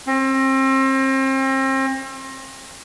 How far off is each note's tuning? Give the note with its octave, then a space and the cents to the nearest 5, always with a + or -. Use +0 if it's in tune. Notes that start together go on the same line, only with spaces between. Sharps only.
C4 +35